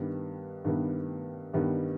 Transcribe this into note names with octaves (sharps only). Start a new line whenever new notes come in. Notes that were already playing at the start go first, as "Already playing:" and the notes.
Already playing: G2 D#3 G3 B3
G2 D#3 G3 B3
G2 D#3 G3 B3